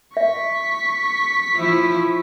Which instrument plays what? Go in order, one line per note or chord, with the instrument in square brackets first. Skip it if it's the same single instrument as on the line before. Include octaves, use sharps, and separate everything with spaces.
[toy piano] E5 [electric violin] C#6 B6
[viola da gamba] F3 E4